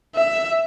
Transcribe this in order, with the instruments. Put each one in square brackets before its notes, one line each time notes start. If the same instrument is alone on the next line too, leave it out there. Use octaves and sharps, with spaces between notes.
[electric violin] E5